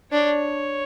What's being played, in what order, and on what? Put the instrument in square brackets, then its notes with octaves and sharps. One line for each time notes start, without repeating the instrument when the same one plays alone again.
[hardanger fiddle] D4 [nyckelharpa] C#5